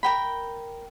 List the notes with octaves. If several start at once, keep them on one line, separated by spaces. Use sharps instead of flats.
A#4 G5 B5